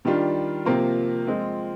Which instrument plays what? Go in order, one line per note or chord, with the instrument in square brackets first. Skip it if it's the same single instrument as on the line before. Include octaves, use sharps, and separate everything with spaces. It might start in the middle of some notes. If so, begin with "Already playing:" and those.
[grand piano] D#3 G3 D4 F4
C3 F3 A#3 F4
F3 G#3 C4 F4